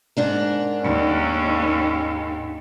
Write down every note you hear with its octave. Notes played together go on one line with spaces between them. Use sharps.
G#2 D4 A#4
D#2 C#4